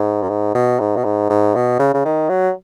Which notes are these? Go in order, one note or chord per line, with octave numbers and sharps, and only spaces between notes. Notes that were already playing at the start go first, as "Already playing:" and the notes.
Already playing: G#2
F#2
G#2
B2
G#2
B2
G#2
G#2
B2
C#3
C#3
D#3
F#3